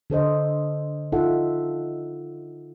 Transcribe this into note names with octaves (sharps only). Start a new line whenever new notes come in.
D3 A4 C5 D#5
D#4 F4 A4 E5 F#5